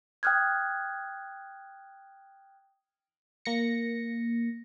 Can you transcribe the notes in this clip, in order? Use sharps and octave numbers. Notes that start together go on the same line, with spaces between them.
G5 D#6 F6 F#6 G#6
A#3 A#6 C#7